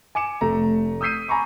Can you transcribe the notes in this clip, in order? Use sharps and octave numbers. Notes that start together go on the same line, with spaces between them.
G#5 D6 C#7 E7
F1 A3 A#5
D#6 E6 G6 B6 C7 D#7
G#5 A#5 B5 C#6 D6